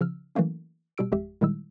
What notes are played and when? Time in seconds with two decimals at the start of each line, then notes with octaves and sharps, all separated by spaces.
0.01 C#3 F3 E6 F6
0.35 E3 F#3 A3 A#3 C#4
0.98 B2 G3 G4 E6 D7
1.12 G#1 F2 G#3 G4 E5
1.41 A#2 D#3 G3 G#3 E4 E6